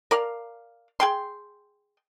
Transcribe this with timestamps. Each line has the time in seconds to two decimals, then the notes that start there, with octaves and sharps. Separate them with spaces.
0.11 A#4 D5 F5
1.00 G#4 G5 C6